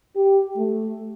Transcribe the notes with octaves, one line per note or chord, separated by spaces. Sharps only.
G4
A3